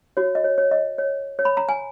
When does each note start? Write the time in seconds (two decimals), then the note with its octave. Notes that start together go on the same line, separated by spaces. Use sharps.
0.17 F#4 C#5
0.35 D#5
0.44 C#5
0.58 C#5
0.71 D#5
0.98 C#5
1.39 C#5
1.45 B5
1.57 A#5
1.69 G#5